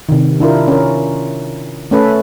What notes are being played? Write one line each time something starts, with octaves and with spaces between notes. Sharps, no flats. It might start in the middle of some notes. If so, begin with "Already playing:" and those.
C3 D#3
D4 E4 F4 A#4
C#4 A#4
A3 C#4 A4 B4